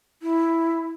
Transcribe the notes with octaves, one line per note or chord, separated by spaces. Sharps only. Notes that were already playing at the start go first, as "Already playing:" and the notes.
E4